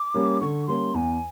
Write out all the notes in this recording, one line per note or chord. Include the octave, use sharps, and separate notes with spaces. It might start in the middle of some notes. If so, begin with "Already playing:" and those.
Already playing: D6
G3 A#3 C#4
D3 C#6
G3 A#3 C#4 C6
E2 G#5